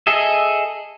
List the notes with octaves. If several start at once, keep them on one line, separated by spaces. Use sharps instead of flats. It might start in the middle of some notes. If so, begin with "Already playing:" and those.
G#4 A4 D#5 E5